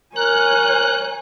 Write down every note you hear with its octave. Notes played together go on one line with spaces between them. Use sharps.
A#4 C#5 G#5 F#6